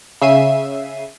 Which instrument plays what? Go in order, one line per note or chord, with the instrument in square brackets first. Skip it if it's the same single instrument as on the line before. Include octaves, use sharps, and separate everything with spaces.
[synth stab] C#3 E5 C7 D#7